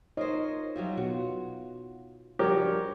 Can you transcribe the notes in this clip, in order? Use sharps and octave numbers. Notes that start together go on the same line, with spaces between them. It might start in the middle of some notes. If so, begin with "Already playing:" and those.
D#4 F4 A#4 C5 C#5 D#5
F#3 G3 F4 E5
B2 F#4
F3 G3 G#3 D4 F#4 G4 A#4 C#5